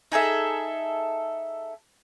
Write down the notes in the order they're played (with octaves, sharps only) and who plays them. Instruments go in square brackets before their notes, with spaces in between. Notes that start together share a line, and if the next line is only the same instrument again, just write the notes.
[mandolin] D#4 G#4 A4 E5